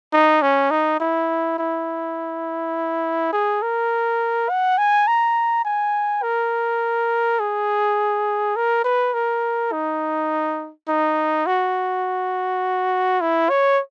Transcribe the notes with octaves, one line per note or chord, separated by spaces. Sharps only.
D#4
C#4
D#4
E4
E4
G#4
A#4
F#5
G#5
A#5
G#5
A#4
G#4
A#4
B4
A#4
D#4
D#4
F#4
E4
C#5